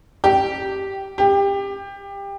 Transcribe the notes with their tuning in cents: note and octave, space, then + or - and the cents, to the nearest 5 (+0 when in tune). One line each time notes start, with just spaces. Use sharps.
G4 -10
G4 +20